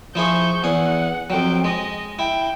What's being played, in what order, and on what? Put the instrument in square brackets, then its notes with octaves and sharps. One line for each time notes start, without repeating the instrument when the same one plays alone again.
[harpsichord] F3 E4 G#4 [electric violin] C#6 G6
[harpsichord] E2 G#4 [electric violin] F#5
[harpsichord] F2 F#3 [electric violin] G5
[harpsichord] G#3 [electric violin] D#5
[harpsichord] E4 [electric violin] G5